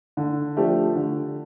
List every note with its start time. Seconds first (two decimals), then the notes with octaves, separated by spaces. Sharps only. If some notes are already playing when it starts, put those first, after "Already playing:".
0.17 D3
0.57 F3 A3 D4 G4
0.96 D3